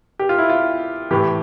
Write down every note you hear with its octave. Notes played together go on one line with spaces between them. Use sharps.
G4
F4
E4
F4
A2 E3 G4